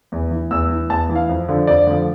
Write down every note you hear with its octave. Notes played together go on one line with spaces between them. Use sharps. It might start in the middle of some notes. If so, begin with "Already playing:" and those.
E2
E3
E2 E6
E3
E2 A5
E3
F5
F2
D3 F3
F2 D5
D3 F3